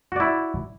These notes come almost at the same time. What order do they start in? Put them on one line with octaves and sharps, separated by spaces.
F#4 D5 E4